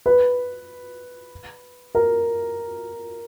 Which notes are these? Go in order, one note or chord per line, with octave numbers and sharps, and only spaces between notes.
B4
A#4